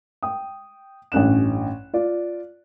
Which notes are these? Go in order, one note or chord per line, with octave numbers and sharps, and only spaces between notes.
G5 D#6
A1 G2 C#4 F#6 E7
F4 D5